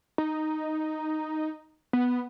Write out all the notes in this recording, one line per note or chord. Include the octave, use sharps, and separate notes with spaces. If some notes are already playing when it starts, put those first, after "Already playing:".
D#4
B3